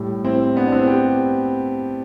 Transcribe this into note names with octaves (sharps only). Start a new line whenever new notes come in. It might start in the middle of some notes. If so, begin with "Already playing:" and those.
Already playing: A2 G3
C4 E4
B3 D4
D4
C4 E4
G4